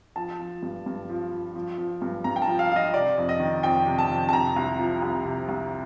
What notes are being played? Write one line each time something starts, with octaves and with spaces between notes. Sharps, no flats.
F3 A5
F3
G2
G2
F3
F3
F3
F3
G2
G2 A#5
G5
A5
F3
F5
F3 F5
D#5
C3 D5
F2
D#5
D#3
F2 G5
C3
A5
F2
A5
C3 A#5
C2
F3
C2
C3
C2